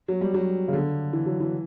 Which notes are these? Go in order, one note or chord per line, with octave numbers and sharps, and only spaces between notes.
F#3
G3
F#3
C#3
D3
E3
F#3
E3